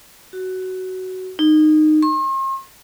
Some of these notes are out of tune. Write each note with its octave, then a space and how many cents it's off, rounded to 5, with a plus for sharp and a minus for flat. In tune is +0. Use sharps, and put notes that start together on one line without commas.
F#4 +15
D#4 -20
C6 +45